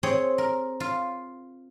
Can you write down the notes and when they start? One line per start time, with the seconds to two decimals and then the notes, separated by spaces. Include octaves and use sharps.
0.03 C4 G#4 C#5
0.38 A#4
0.80 F4